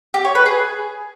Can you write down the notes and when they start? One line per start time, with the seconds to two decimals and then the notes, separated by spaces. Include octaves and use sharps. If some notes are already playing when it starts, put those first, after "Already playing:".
0.14 G4
0.25 C#5
0.35 B4
0.46 G#4